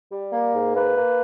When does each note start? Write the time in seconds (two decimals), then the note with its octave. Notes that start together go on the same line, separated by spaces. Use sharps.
0.11 G3
0.32 A#3
0.53 G#2
0.74 A#3 B4
0.96 A#3